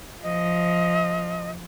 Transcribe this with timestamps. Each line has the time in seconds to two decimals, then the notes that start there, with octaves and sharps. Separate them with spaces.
0.23 F3 D#5